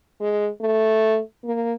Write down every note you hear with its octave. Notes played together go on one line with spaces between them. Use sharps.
G#3
A3
A#3